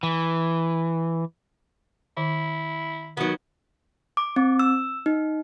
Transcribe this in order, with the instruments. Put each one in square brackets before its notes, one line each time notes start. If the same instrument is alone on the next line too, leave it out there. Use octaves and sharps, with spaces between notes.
[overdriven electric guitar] E3
[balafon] D#3 [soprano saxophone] E4
[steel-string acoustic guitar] D#3 F#3 [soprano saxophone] B3
[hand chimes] D6
C4
E6
D#4